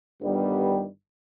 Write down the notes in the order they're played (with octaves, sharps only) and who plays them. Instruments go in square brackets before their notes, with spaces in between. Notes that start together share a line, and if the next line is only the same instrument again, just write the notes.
[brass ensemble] G1 G2 D#3 G3 B3